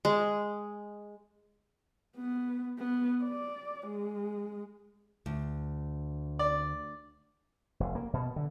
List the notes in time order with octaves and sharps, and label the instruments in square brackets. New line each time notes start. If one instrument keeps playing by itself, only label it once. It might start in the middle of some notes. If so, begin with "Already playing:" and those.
[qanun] G#3
[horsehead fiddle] B3
B3
D5
G#3
[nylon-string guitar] D2
[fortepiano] D5
[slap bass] F1
A#3
B2
D3